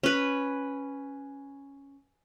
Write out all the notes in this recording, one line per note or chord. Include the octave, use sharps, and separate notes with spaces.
C#4 B4